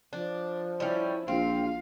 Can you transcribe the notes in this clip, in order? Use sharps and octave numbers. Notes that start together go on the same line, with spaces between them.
F3 D4
G3 C#4 E4
A#1 C4 F4 F5